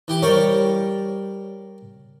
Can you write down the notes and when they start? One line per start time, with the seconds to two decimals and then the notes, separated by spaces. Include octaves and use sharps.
0.08 E3 G4 D6
0.22 G3 A#4 C#5 D5 G5